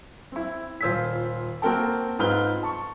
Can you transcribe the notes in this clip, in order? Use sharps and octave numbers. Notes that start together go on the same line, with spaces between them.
C4 E4
D#1 F4 C5 E6 G#6 B6
A#3 C4 F#4 A#4 G5 A5
G#2 C4 F4 B4 F6 G7
A5 C#6